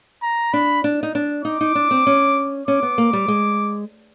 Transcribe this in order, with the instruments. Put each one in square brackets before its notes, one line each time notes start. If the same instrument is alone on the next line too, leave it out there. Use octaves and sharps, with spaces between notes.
[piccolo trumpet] A#5
[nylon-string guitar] D4 [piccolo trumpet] B5
[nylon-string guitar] D4
D#4
D4
[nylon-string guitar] D#4 [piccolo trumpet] D6
[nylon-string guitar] D#4
D4
C4
C#4
[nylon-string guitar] C#4 [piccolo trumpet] D6
[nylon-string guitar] B3
A#3
G3
G#3